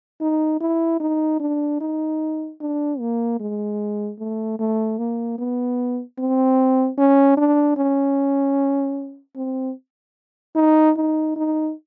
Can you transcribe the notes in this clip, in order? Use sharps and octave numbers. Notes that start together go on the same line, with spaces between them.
D#4
E4
D#4
D4
D#4
D4
A#3
G#3
A3
A3
A#3
B3
C4
C#4
D4
C#4
C4
D#4
D#4
D#4